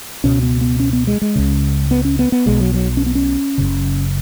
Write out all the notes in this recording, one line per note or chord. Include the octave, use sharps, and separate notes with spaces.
C#2 B2 C#4
B3
B3
C#4
B3
G#3
G#3
C#2 C#3
B3
C#4
B3
B3
B1 B2 G#3
F#3
F#3
C#4
B3
C#4
F#1 F#2 C#3